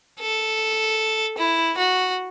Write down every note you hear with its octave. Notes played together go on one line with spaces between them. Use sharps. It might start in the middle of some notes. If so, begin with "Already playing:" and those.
A4
E4
F#4